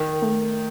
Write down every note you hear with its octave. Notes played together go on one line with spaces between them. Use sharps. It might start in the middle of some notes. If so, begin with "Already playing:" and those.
Already playing: D#3
A3